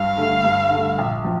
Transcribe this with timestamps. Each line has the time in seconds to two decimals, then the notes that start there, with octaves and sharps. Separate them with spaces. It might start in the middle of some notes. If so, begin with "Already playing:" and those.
Already playing: G2 F5
0.17 D3 A3
0.44 G2
0.71 D3 A3
0.98 A#1
1.24 F3